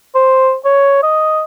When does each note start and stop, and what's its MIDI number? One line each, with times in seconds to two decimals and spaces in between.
0.15 0.55 72
0.65 0.98 73
1.03 1.43 75